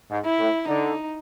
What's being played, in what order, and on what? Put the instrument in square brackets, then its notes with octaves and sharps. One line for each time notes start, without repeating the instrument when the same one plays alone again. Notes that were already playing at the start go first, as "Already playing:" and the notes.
[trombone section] G#2
[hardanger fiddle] E4
[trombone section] A2
[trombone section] D3 [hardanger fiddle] D#4